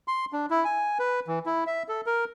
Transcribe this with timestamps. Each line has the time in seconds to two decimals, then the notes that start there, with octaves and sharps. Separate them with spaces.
0.08 C6
0.33 D4
0.50 E4
0.65 G#5
0.99 B4
1.27 E3
1.46 E4
1.67 E5
1.89 A4
2.06 A#4